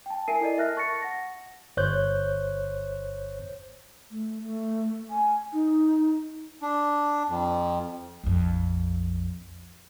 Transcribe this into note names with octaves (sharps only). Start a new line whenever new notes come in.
G5 A5
E4 A#4 E5 G#5 C7 D#7
E4 A4 D5 D#5
A#4 E5 A5 F6 F#6 A#6
A5 C#6 A6 A#6 C#7
F#5 A#6
G1 C5 C#5 F#6 G6
A3
A3
G#5
D#4
D4
F2
A#1 F2